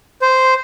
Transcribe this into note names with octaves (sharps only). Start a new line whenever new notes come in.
C5